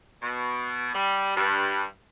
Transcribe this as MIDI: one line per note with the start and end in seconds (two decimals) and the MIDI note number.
0.23 0.91 47
0.94 1.32 55
1.37 1.84 43